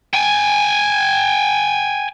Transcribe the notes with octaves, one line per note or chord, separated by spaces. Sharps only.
G5 G#5